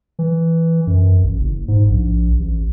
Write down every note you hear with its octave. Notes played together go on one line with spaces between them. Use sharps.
E3
F#2
A1
F#1
G#2
A#1
A1